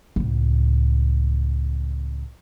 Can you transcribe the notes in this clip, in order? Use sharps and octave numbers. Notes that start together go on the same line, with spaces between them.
C#2 A2